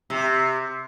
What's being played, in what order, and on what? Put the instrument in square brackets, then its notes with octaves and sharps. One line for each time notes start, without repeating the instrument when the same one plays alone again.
[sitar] C3